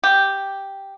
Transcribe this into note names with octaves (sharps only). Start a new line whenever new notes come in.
G4